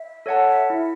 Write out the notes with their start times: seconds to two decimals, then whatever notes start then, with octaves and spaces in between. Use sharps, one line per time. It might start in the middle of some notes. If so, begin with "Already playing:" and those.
Already playing: E5
0.26 A4 C#5 F#5 A5
0.70 E4